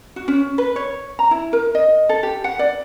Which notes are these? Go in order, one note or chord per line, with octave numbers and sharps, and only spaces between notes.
F#4
C#4
B4
C#5
A#5
E4
A#4
D#5
A4
G4
F#5
D5